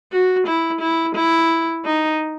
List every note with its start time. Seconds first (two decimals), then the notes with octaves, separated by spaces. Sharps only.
0.12 F#4
0.47 E4
0.81 E4
1.15 E4
1.85 D#4